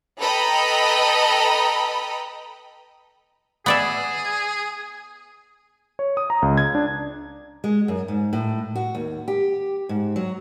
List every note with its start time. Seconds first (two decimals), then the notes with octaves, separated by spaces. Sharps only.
0.20 A4 B4 D#5 G5 A#5 B5
3.66 B3 G#4 D5 E5
5.99 C#5
6.17 D#6
6.30 A#5
6.42 C#2
6.58 G#6
6.75 D4
7.64 G#3
7.88 F#2
8.08 G#2
8.33 A2
8.75 F#4
8.95 D#2
9.28 G4
9.89 G#2
10.16 F#3